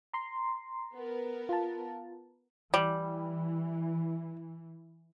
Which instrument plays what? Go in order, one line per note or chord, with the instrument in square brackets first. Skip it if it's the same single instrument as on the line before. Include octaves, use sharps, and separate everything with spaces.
[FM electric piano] A#5 C6
[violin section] B3 A#4
[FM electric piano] F4 A5
[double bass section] E3 [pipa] G3